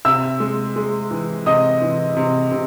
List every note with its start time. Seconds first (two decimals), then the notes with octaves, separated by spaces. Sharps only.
0.05 C3 E5 E6
0.40 G#3
0.76 G#3
1.11 E3
1.46 C3 D#5 D#6
1.82 E3
2.17 C3
2.52 C3